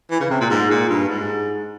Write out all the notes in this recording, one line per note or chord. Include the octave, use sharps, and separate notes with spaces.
E3
C#3
C3
A#2
G#2
A#2
G2
G#2